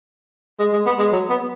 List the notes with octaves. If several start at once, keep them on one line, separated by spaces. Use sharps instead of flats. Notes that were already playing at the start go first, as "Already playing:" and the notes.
G#3
G#3
B3
G#3
F#3
B3